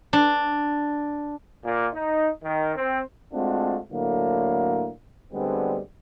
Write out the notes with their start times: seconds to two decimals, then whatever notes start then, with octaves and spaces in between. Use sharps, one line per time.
0.13 D4
1.65 A#2
1.94 D#4
2.43 D#3
2.77 C4
3.33 G#3 A3 C4 D4 F4 F#4
3.91 A2 D3 F#3 A#3
5.32 D2 D3 G3 G#3 B3 C4